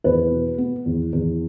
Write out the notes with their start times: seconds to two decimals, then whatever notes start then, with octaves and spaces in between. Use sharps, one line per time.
0.04 E2 B4
0.31 B2
0.58 B3
0.86 E2
1.13 E2